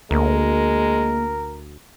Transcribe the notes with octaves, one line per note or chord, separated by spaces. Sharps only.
D2 G#3 A#3 A#4